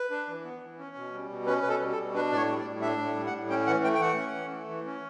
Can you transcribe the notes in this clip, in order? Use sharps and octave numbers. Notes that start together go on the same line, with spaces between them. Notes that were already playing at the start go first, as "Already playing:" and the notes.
Already playing: B4
D4
E3
B3
E3
C#4
B2
G3
B2
C#4 B4
B2 B4
A4
G3
A4
B2
D4 B4
A2 C#5 D5
G3
D5
A2
D4 E5
A2
G3
F#5
A2
C#4 G5
E3 F#5
A3 G5
G5
E3 F#5
C#4
E3
A3
E3
C#4